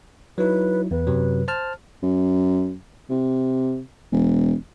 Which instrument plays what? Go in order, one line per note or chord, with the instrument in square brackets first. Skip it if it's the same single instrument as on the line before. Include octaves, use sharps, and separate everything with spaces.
[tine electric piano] F#3 D#4 E4 [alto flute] B4
[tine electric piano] E2 [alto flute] B4
[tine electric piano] F#2 C3 F#3
C5 A5 F6
[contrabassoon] F#2
C3
E1